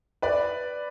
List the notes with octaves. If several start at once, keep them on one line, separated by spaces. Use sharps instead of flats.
B4 D5